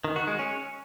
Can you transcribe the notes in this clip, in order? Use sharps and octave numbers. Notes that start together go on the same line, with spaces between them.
D#3
F#4
G#3
C#4